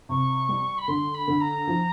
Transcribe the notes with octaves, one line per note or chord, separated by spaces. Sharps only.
C3 C#6
G3
B5
D3 C6
B5
D3
A#5
F3